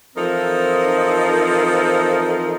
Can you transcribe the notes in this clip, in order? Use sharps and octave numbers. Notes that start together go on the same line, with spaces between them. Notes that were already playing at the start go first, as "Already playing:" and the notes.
E3 F3 C4 D#4 A4 A#4